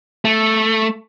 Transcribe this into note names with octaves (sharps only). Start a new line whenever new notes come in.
A3